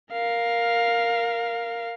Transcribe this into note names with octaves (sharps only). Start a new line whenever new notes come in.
A#4 F5